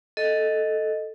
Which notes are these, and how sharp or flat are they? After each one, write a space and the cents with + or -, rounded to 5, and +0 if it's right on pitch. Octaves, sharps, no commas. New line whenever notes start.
A4 +0 D#5 +0